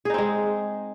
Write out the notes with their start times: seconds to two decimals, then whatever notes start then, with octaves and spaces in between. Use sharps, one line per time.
0.05 G#4
0.10 D#4
0.14 C4
0.18 G#3